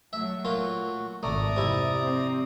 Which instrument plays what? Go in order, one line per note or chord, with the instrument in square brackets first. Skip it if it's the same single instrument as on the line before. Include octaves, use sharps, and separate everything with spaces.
[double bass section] F#3 A3 [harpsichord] E5
[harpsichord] A#2 F4 [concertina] F#4
[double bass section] G#1 A#2 [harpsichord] A3 [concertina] D5 A#5 D#6
[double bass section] F2 [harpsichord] C3 E4
[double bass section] C4